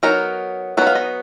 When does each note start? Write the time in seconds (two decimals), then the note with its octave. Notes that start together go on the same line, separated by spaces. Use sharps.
0.03 F#3 B3 D#4 A#4
0.77 F#3 B3 D#4 B4
0.87 F5
0.95 D#5